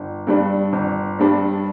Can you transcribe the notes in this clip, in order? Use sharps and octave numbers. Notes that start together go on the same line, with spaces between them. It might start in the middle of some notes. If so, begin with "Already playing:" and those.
Already playing: G1
G2 G3 D4
G1
G2 G3 D4